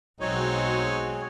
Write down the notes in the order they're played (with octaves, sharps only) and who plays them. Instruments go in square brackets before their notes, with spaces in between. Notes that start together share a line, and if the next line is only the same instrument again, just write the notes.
[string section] B1 [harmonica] F#3 C4 D#4 [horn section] G#3 F#4 G#4 [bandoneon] C#5